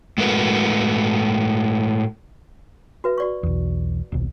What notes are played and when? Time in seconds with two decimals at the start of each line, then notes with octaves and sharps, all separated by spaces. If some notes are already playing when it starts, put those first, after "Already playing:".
0.18 A2 G#3 A3 F#4 A#4 B4
3.04 F#4 B4 E5
3.18 F#4 D5 C#6
3.43 B1 E2
4.12 D#1 B1